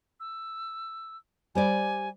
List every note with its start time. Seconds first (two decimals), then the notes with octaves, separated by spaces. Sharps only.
0.20 E6
1.55 G3 C5 D5 G#5